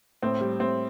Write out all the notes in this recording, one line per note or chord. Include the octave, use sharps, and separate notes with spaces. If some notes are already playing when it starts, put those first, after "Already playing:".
A2 C4
G3
A2 C4